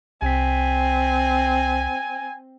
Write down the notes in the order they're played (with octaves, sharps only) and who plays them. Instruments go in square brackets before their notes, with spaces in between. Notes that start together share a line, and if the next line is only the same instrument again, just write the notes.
[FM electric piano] C2 B6 [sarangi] C4 [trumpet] G#5